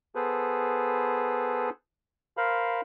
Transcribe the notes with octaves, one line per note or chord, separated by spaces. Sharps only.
B3 G#4 A4 B4 C5
A#4 C5 F5 B5